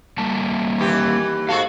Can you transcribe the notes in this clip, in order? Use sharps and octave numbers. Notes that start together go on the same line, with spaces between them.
G3 A#3 A5
D#2 E3 G4
G#2 F#4 A4 F5